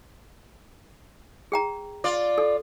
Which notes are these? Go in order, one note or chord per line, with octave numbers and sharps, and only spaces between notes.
G#4 G5 A#5
F4 D5
A4